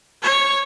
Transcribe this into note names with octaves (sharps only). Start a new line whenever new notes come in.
C#5